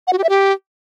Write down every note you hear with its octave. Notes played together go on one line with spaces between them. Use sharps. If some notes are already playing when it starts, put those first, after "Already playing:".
F#5
F#4
G4
E5
G4